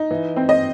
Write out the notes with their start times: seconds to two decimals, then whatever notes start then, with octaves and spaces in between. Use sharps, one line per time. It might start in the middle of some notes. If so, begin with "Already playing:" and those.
Already playing: D#4
0.11 E3
0.36 C4
0.49 D#5